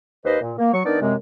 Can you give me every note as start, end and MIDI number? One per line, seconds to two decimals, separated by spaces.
0.25 0.38 39
0.25 0.38 71
0.25 0.38 72
0.25 0.38 75
0.41 0.53 46
0.59 0.70 58
0.73 0.81 54
0.73 0.81 85
0.85 1.00 51
0.85 1.00 59
0.85 1.00 62
0.85 1.00 63
0.85 1.00 70
0.85 1.00 74
1.01 1.14 42
1.01 1.14 48
1.01 1.14 56
1.01 1.14 60